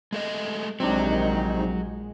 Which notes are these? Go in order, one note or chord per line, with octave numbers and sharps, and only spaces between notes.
G#3 A3 D#5
A#1 C3 D#3 F#3 G#3 C4 D4 D#4